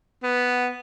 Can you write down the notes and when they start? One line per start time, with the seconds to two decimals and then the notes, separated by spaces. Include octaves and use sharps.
0.23 B3